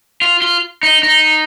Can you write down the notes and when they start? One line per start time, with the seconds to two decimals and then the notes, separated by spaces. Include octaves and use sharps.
0.22 F4
0.42 F4
0.83 D#4
1.03 D#4